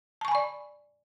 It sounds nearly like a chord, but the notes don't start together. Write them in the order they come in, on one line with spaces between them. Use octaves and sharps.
A5 C#6 G#5 B5 D5